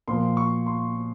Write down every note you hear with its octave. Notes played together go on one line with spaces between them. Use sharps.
A#2 F3 A#3 C6
C#6
C6